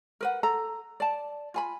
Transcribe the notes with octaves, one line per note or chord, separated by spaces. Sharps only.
A#4 B4 F#5
A4 A#5
D5 A5
F4 G#5 B5